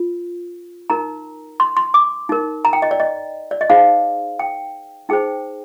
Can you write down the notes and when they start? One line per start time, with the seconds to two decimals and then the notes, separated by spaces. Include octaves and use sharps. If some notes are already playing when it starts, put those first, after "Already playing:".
Already playing: F4
0.90 D#4 A#4 A#5
1.60 C6
1.77 C6
1.94 D6
2.29 D#4 A#4
2.65 A#5
2.73 G5
2.82 D#5
2.91 D5
3.00 D#5
3.51 D5
3.61 D#5
3.69 D#4 G#4 C5 F5
4.39 G5
5.09 D#4 G#4 C5 G5